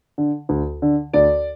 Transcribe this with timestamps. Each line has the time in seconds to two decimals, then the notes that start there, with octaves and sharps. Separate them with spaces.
0.18 D3
0.49 D2
0.82 D3
1.14 D2 D5